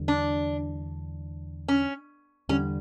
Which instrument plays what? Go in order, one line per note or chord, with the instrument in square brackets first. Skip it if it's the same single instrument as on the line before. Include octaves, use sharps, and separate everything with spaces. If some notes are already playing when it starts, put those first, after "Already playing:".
Already playing: [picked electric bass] E2 D3 G3
[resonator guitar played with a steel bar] D4
C#4
[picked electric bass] E2 D3 G3 [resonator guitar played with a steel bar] C#4